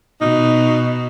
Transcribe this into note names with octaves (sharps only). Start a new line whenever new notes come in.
B2 D#4